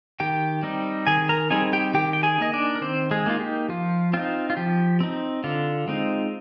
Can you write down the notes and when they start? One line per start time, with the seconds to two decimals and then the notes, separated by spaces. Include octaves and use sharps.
0.20 D#3 G4 G5
0.63 G3 C4 D#4
1.07 D#3 G#4 G#5
1.29 A#4 A#5
1.50 G3 C4 D#4 G#4 G#5
1.73 G4 G5
1.94 D#3 G4 G5
2.13 G5
2.23 G#4 G#5
2.38 A#3 D#4 D#5
2.53 D4 D5
2.75 A#4
2.81 D#3 C4 C5
3.11 G#3 G#4
3.26 A#3 D#4 F4
3.40 G4
3.69 F3 F4
4.13 C4 D#4 F4
4.50 F4
4.57 F3 G4
5.00 C4 D#4
5.44 D3 F4
5.88 G#3 C4 D#4